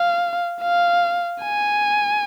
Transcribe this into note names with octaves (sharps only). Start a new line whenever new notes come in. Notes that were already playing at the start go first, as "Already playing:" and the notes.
Already playing: F5
F5
G#5